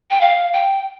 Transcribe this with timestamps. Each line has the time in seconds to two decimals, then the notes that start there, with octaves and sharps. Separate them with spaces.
0.11 G5
0.21 F5
0.53 G5